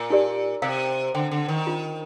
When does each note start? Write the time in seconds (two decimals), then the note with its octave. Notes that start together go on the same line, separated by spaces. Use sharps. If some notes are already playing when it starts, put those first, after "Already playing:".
Already playing: A#2
0.10 D#4 G4 A#4 D5
0.62 C3 A#4 F5 A#5
1.14 D3 C5 G5 C6
1.31 D3
1.48 D#3
1.67 D4 F4 C5